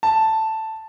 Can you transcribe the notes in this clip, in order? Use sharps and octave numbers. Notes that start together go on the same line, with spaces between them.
A5